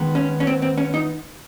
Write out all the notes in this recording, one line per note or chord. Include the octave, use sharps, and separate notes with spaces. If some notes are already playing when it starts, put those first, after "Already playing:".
Already playing: D#3 G#3 B3
C#4
C#4
C4
C4
C#4
D#4